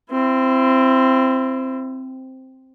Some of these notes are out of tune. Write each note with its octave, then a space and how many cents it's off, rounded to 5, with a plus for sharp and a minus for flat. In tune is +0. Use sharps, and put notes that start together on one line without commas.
C4 +0 E4 +35